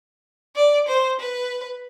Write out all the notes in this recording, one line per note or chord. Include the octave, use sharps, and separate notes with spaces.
D5
C5
B4